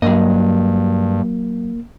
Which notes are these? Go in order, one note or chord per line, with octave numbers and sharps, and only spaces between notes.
G2 F#3 A#3 D#5